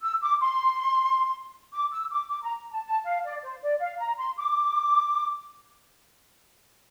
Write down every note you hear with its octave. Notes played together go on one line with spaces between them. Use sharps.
E6
D6
C6
D6
E6
D6
D6
A#5
A5
A5
F5
D5
C5
D5
F5
A#5
C6
D6